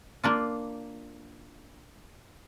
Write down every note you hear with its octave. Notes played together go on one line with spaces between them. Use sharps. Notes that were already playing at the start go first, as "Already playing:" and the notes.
A#3 D4 F4